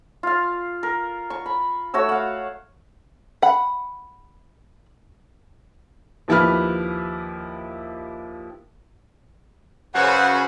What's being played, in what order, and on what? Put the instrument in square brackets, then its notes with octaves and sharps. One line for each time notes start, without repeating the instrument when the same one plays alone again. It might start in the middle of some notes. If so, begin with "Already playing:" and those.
[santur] F4 F5
A#4
C#6
B5
A3 F#4 C#5 E6
F5 F#5
[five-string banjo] F#5 B5
[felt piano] D#2 F3 E4 G4 B4 F6
[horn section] F#2 C#3 F#4 [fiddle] B4 C5 [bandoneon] F#5